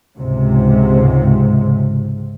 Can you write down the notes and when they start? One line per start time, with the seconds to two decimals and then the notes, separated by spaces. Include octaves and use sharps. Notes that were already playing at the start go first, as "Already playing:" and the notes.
0.17 C#2 G#2 C3